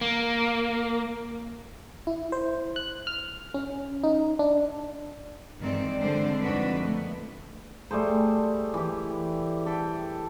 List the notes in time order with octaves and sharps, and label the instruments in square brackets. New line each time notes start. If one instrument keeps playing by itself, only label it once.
[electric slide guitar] A#3
[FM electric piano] E4
C5
F#6
F6
C#4
D#4
D4
[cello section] G2 D#3 E3 G#3 C4 D5
D3 G3 G#3 C4 D4 C5
F2 D#3 D4 F#4 B4
A3 B3
[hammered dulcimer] G3 A3 G#4 C5
E3 G4
A4 E5 G5